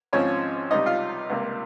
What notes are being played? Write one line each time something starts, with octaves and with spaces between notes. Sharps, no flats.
G#1 G#2 F3 C4 C#4 C#5
C#2 C3 G3 D#4 D#5
F4 F5
C#2 C3 G3 A#3